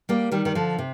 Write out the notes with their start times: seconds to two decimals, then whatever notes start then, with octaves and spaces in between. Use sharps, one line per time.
0.09 G3 A#3
0.32 D#3 G3
0.45 D#3
0.55 D3 F3
0.78 C3